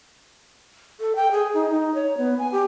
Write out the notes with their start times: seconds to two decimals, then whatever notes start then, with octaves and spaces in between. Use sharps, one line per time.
1.00 A4
1.16 G5
1.31 G#4
1.54 D#4
1.70 D#4
1.95 C#5
2.18 B3
2.39 G#5
2.52 G4